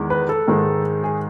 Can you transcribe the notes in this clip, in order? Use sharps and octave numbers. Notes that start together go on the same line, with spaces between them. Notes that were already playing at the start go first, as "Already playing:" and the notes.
Already playing: E2 D#3 G#3
B4
A4
G#2 D#3 G#3
G#4